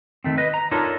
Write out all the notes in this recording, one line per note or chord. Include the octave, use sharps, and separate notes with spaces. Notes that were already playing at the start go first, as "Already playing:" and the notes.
D#3 A3 C4
B4 D#5
A#5
D4 D#4 F4 A4 A#4 C#5